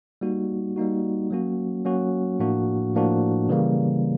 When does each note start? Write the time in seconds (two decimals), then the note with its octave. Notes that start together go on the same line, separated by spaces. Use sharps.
0.21 G3 A#3 D#4 F#4
0.76 G3 A#3 D#4 F#4
1.30 F#3 A#3 C#4 F#4
1.85 F#3 A#3 C#4 F#4
2.39 A2 F3 A#3 D4 F#4
2.94 A2 F3 A#3 D4 F#4
3.49 C#3 E3 G3 A#3